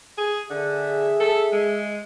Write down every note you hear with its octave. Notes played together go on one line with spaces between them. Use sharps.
G#4
D3 G#4 E5
A4
G#3